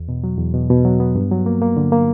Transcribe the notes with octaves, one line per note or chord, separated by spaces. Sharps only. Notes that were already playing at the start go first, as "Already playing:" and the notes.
Already playing: E2
B2
F#3
E2
B2
B2
F#3
B3
G2
F#3
A#3
A#3
D3
A#3